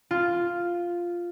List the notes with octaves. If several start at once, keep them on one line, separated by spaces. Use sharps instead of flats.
F4